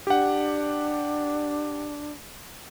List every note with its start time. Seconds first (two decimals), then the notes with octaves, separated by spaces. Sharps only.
0.07 D4 G4 F#5